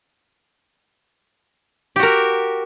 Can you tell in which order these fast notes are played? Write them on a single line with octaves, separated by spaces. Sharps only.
G4 F#4 A#4